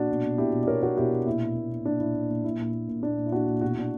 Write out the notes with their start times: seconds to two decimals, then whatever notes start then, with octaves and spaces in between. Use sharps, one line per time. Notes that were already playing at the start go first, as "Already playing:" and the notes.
Already playing: A#2 D4 F#4
0.09 B2
0.23 B2
0.38 B2 E4 G4
0.52 B2
0.63 D5
0.67 B2 A#4 C#5
0.82 B2 F#4 A#4
0.97 B2 E4 G4
1.12 B2
1.26 A#2 E4
1.41 A#2
1.56 A#2
1.70 A#2
1.85 A#2 D4
2.00 A#2 E4
2.15 A#2
2.29 A#2
2.44 A#2 E4
2.59 A#2
2.73 A#2
2.88 A#2
3.03 A#2 D4
3.17 A#2
3.26 E4
3.32 A#2 D4 F#4
3.47 A#2
3.61 B2 F#4
3.71 E4
3.77 B2 D4